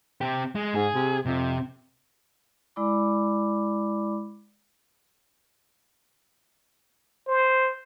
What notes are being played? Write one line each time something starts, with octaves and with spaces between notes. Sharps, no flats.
C3 G4
G#3
G#2 G#4
C3
F2 C3
G#3 E4 D5 B5 D6
C5